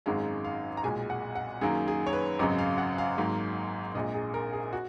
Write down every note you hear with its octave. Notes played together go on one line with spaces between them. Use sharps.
G#1 F#2 D#3 G#3 F5
F5
A#5
B1 A#2 G#3 G#5
F#5
F#5
F#2 D#3 F#3 A#3 G#4
G#4
C#5
B4
G#1 F#2 C#3 F#3 D#5
F5
F#5
F5
G#1 G#2 F#3 A#3
A#1 A#2 G#3 D#5
G#4
A#4
G#4
F#4